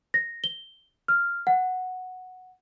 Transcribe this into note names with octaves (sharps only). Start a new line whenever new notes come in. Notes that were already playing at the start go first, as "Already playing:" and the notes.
A#6
G7
F6
F#5